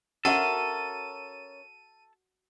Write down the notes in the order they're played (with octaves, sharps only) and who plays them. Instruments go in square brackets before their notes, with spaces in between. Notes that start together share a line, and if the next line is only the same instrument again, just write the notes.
[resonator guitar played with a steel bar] C#4 A#4 E5 [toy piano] F#4 F#5 A5 [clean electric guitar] A4 [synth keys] D#7